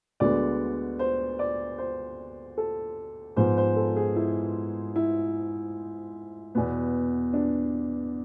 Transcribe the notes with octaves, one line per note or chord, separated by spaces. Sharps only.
D2 D3 G#3 B3 D5
C5
D5
C5
A4
G#2 F3 B3 C5
C5
A4
G#4
E4
E4
E2 B2 B3
D4